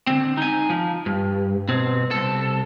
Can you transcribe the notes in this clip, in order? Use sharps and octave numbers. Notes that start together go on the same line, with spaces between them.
D3 C4
D#4 G#5
F3
G2
B2 C4
C2 A4